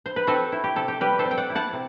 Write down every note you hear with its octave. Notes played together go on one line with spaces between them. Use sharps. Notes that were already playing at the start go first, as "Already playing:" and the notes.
C5
B4
C4 F#4 A4
E4
G4
C3 A4
G4
G3 G4 B4
A4 C5
C4
G5
D5 F#5
E4
F#5 A5
C3